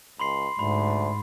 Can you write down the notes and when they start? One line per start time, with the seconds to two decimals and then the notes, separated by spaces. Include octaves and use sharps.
0.20 C#2 B5 C6 C7
0.59 D2 G#2 B5